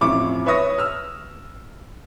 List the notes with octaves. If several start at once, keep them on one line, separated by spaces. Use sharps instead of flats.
A1 F2 E4 C#6 D6
B4 C#5 E5 C#6 D#6 A#6
E6 F6